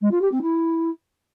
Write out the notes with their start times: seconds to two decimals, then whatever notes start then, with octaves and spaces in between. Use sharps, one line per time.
0.01 G#3
0.11 F4
0.21 G4
0.32 C4
0.42 E4